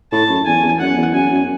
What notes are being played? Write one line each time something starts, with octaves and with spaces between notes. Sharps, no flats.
A2 A5
F#2
E2 G#5
E2
F#2 F#5
E2
F#2 G#5
F#2